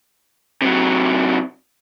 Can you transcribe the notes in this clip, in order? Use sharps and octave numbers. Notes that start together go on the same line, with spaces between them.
C3 F#3